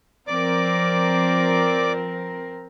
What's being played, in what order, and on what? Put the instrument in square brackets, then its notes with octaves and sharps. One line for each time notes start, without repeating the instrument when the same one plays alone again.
[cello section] F3 C4 A#4 [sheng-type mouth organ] D5 D6